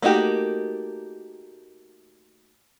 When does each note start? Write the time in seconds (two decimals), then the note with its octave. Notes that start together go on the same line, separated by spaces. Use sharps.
0.02 A3 A#3 D#4 F#4 G4